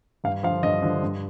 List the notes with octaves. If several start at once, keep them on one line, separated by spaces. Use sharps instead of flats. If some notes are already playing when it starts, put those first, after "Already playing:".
G2 F5
D3 F3 F5
G2 D#5
D3 F3
G2